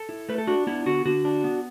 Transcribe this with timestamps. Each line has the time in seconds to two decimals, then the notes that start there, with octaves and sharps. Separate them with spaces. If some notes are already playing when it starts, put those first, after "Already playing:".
Already playing: A4
0.09 E4
0.29 A3 B4
0.38 A4
0.47 D4 F#4
0.67 B3 E4
0.86 D3 F#4
1.05 D3 F#4
1.25 D4
1.44 B3